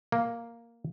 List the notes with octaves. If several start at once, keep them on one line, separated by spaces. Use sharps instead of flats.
A#3